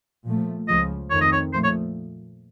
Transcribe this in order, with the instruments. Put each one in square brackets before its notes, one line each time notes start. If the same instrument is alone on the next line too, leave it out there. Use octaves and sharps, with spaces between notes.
[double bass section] A#2 F3 A3
[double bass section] C#2 C#3 F3 [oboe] D#5
[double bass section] F2 D#3 A3 C4 [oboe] C#5
[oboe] D#5
C#5
[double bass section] A#2 F3 A3 [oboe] C5
[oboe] C#5